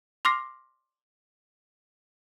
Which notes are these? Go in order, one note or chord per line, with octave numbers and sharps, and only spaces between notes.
C6 D6 F6 A#6 C7